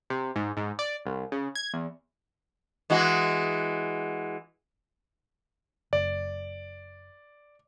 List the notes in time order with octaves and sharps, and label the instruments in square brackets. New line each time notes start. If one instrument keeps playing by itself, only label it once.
[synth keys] C3
G#2
G#2
D5
C2
C#3
G#6
E2
[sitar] E3 G#3 F#4
[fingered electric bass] F#1 [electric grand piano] D5